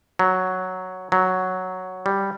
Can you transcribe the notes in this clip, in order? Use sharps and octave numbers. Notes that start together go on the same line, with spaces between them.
F#3
F#3
G3